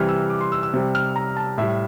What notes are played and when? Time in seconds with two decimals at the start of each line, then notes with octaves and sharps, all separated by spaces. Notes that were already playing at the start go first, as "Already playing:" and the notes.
Already playing: C3 E3 G3 F6
0.09 E6
0.30 D6
0.41 C6
0.52 E6
0.63 E6
0.74 C3 G3
0.95 F6
1.16 A#5
1.37 A5
1.58 A2 G3 E5